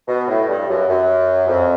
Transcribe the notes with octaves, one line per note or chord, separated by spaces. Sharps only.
B2
A2
G2
F#2
F#2
F2